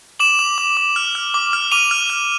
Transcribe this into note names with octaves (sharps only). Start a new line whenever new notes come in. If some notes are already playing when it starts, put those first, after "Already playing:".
D6 E7 F#7
D6
D6
D6
F6
F6
D6
F6
D6 D#7 F7
F6
F6